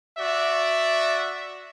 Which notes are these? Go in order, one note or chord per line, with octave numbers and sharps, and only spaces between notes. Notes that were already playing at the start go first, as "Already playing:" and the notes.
F#4 D5 E5